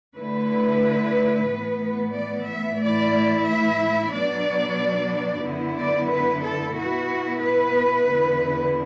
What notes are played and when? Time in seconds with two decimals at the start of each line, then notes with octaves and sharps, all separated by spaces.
0.18 D3 A3 E4 B4
1.50 A2 E3 B3
2.15 D5
2.49 E5
2.82 A2 E3 A3 E4 D5
3.48 E5
4.14 B2 F#3 B3 D4 D5
5.45 F#2 D3 B3 E4
5.79 D5
6.12 B4
6.44 A4
6.78 B2 B3 E4 F#4
7.43 B4
8.09 E2 D3 B3 E4